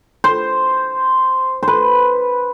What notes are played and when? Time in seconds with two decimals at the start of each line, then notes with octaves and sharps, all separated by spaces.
0.24 C5
1.63 C5
1.68 B4